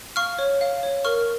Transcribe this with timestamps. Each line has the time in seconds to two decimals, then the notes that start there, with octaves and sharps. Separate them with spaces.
0.16 F5 C#6 F6
0.39 C#5
0.61 F5
0.83 C#5
1.05 A#4 C#6 F6